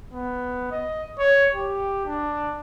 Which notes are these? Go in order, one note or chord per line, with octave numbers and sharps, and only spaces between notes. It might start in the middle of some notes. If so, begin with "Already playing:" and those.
B3
D#5
C#5
G4
D4